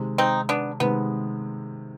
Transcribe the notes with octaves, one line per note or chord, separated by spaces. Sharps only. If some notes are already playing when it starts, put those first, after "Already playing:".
Already playing: C3 D#3 G#3
C4 D#4
B3 D4
C3 D#3 G#3 B3